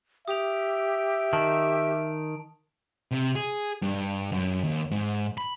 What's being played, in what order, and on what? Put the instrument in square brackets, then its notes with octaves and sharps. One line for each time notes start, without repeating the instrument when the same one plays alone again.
[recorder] G4 [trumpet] E5 [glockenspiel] D#6 F7
[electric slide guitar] D#3 [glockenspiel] A5 D7
[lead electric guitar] C3
G#4
G2
F#2
D#2
G#2
B5